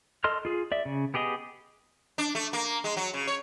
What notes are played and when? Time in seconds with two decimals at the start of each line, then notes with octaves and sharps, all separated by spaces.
0.24 A4 D#5 C6 F6
0.45 F4 G#4
0.72 D5 E5
0.85 C#3
1.14 B3 G4 G#4 D#5
2.18 D4
2.35 A3
2.53 A#3
2.84 G#3
2.97 F#3
3.14 C#3
3.27 C#5